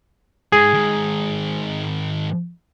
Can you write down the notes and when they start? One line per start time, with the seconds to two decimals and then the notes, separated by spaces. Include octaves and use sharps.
0.52 G#2 G#4
0.73 G#2 D#3